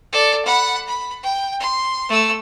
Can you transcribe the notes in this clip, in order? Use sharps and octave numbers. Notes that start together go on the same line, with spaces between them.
A4 D5
F#5 B5
B5
G5
C6
A3 E6